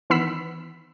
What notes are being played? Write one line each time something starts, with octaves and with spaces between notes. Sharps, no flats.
D#3 E3 B3 B5 E6 B6